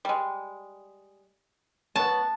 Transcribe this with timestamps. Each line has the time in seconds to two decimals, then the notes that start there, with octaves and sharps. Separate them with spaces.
0.05 G3 G#3
1.96 F#3 B3 A5